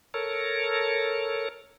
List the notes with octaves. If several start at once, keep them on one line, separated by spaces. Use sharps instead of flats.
A4 A#4 C#5